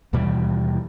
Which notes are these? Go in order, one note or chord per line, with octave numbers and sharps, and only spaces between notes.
D#2 B2 E3 G3